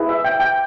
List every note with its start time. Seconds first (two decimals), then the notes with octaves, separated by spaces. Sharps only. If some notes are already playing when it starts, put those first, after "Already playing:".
Already playing: E4 G#4 B4
0.09 E5
0.25 G5
0.40 G5